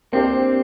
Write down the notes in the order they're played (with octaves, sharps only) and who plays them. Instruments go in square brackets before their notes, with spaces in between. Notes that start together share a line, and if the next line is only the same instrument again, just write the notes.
[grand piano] A#3 D4 G4 C5 [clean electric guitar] C4